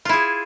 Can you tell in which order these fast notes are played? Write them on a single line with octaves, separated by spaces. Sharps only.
F4 E4 G#4